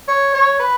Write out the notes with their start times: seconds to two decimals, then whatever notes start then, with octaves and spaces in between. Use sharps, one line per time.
0.08 C#5
0.34 C#5
0.60 B4